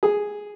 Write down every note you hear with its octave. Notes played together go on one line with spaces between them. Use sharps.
G#4